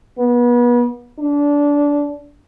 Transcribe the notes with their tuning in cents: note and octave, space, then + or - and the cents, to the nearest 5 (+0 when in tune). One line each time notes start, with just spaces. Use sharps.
B3 -30
D4 -20